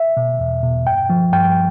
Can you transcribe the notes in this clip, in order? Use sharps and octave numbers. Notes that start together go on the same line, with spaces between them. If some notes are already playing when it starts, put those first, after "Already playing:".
Already playing: E5
B2
E2
B2
G2 G5
F3
G2 G5